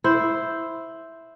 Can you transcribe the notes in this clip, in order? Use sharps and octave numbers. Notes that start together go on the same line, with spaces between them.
E4 C5